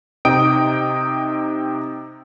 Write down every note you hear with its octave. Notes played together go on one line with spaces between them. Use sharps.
C3 D#4 G5 D#6 D7